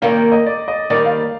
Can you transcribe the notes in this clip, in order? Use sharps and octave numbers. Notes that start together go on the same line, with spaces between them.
C3 D#3 G3 A#3 F5
D#5
D5
D#5
D#2 D#3 G3 D5
F5